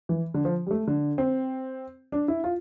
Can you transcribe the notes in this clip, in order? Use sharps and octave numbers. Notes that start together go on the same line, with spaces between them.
E3
D3
F3
G3
A3
D3
C4
D4
E4
F4